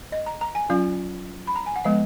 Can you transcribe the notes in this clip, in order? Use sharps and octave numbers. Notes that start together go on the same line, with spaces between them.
D#5
A#5
A#5
G#5
F#3 C#4 F4 F5
B5
A#5
G#5
F#5
F3 G#3 B3 F5